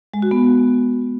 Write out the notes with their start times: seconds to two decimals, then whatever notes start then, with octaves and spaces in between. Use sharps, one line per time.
0.14 G#3
0.22 F#4
0.31 B3